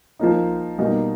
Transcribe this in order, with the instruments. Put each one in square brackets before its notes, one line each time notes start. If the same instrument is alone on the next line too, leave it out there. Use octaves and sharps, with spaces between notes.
[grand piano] F3 A#3 D#4
B2 G3 A#3 D#4